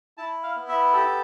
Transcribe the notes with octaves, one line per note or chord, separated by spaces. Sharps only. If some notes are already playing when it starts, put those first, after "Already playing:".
E4 A5
F5
B3
E5
G4 A4